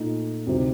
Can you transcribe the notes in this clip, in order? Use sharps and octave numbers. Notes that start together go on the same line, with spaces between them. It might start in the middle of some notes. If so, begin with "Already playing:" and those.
Already playing: A#2 A3 D#4
D2 C3 G3 C4 D#4